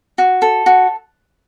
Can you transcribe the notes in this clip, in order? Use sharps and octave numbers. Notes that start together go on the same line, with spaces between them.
F#4
A4
F#4